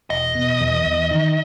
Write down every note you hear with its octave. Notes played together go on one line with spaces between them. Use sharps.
E1 D#5
B2
E2
E2
D#3